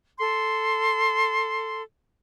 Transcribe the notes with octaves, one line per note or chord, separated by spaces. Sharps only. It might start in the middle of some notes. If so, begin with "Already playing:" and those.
A4 C6